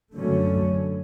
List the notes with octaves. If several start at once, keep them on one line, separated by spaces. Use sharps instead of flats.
F#2 D3 F#3 A3 C#4